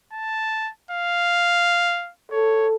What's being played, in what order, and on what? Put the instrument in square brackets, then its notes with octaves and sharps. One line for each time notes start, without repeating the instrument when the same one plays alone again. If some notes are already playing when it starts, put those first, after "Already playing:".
[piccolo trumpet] A5
F5
[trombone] A4 [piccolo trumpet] C#5